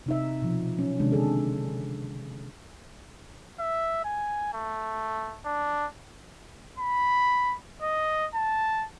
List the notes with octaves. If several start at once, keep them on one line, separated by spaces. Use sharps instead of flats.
C3 D#4 E5
B2 F3
F#3 C#4
C3 D#3 G#3 D4
D3 G#4 A4
E5
G#5
A3
D4
B5
D#5
A5